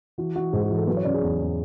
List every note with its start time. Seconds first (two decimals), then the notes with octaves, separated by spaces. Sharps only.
0.18 E3 F#4
0.35 E3 F#4
0.53 G#2 G#4
0.64 G#4
0.70 E3
0.76 A4
0.87 F#3 B4
0.97 C#5
1.04 C#3 D5
1.14 G#4
1.22 E2
1.39 E2